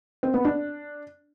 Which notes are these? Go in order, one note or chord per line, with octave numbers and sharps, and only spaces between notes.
C4
B3
D4